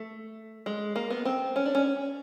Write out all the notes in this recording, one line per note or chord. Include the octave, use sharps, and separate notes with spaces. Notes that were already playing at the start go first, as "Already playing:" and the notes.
Already playing: A3
G#3
A#3
B3
C4
C#4
D4
C#4